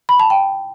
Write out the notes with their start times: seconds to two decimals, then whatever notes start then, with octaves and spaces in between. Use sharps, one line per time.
0.09 B5
0.20 A5
0.30 G5